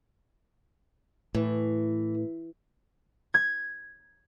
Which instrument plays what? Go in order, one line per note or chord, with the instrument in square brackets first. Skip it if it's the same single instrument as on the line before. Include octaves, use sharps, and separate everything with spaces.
[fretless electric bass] A2 [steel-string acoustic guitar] E3
[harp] G#6